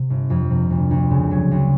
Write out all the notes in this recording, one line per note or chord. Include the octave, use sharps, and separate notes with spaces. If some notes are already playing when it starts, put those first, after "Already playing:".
Already playing: C3
G1
F2
C3
D2
D2
C#3
F#3
D2